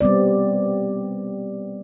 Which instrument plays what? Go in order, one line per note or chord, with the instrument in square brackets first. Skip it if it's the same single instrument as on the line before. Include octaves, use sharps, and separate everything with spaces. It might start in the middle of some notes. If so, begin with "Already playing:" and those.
[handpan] G3 B3 C4 D5